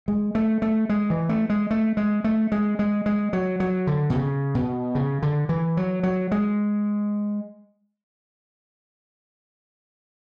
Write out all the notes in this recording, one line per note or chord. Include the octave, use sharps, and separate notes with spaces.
G#3
A3
A3
G#3
E3
A3
G#3
A3
G#3
A3
G#3
G#3
G#3
F#3
F#3
D3
B2
C#3
B2
C#3
D3
E3
F#3
F#3
G#3